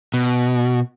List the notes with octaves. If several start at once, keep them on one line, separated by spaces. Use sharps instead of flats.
B2